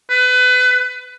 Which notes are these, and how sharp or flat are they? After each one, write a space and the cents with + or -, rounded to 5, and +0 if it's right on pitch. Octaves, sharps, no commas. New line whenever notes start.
B4 +30